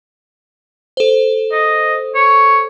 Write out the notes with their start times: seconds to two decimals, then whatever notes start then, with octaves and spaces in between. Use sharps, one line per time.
0.97 A4 C5
1.52 D#5
2.15 C#5